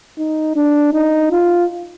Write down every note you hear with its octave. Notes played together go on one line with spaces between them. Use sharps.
D#4
D4
D#4
F4